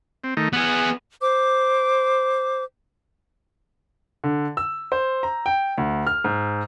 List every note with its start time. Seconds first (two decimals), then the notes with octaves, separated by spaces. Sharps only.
0.24 C4
0.37 D#3 A3 D#4
0.53 B3 G#4 F#5
1.21 C5 D6
4.24 D3
4.57 E6
4.92 C5
5.23 A#5
5.46 G5
5.78 D2
6.07 F6
6.24 G#2